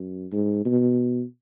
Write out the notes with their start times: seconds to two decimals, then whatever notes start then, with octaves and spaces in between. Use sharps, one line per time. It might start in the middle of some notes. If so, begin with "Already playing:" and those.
Already playing: F#2
0.32 G#2
0.65 B2